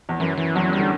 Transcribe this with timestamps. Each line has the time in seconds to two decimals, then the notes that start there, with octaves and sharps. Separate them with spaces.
0.09 E2
0.20 F#2 E3
0.38 E3
0.55 E2 F#3
0.67 F#2
0.73 G3
0.78 D3